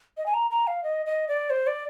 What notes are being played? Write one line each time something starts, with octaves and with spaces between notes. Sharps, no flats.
D#5
G#5
A#5
A#5
F5
D#5
D#5
D5
C5
D5